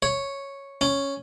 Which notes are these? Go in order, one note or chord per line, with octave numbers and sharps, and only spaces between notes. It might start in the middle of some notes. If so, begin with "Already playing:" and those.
C#5
C#4